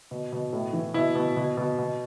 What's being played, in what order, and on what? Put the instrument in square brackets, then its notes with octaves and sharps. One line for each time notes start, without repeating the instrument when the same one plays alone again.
[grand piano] B2
B2
A2
E3
B2 E4
B2
B2
B2
B2